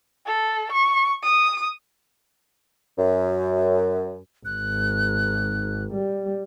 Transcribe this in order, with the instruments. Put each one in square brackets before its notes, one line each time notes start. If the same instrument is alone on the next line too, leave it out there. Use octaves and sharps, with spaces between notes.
[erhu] A4
C#6
D#6
[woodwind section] F#2
[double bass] G#1 [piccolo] F#6
[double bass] G3